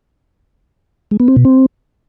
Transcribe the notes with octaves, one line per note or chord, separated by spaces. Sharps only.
G#3
B3
C4
B2
C4